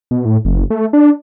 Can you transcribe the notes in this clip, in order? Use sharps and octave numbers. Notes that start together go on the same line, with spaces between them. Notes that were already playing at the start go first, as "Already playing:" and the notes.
B2
A2
F#1
A3
D4